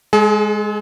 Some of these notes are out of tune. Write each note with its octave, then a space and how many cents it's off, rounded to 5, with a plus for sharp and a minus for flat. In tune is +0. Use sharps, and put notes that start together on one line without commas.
G#3 +0 G#4 +45